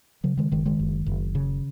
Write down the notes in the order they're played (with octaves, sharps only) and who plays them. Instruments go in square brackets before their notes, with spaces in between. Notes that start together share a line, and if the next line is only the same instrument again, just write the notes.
[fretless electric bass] C#3 F#3
D#3 G#3
F#1 D#3 G#3
D#3 G#3
F#1
F#1
C#3